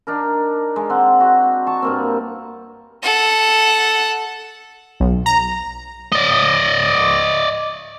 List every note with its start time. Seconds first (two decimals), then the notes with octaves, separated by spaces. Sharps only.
0.07 D4 D#4 A#4
0.76 G#3
0.90 C4 F#5
1.20 F#4
1.67 A5 C#6
1.82 G2 A#3 C4
3.02 A4 F#5
5.00 B1
5.26 A#5
6.12 D5 D#5